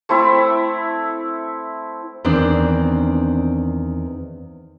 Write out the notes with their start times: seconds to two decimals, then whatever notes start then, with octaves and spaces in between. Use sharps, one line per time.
0.09 A3 C4 E4 E5
2.25 E2 D#3 C4 D4 D5